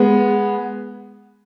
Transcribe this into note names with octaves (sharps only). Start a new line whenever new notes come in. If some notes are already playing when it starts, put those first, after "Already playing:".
Already playing: G#3 B3